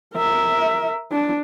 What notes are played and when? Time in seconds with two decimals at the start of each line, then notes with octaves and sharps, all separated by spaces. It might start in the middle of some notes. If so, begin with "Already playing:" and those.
0.14 A#4 E5
1.12 D4